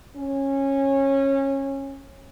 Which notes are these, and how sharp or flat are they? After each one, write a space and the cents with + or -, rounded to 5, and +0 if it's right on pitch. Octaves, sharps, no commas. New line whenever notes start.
C#4 -20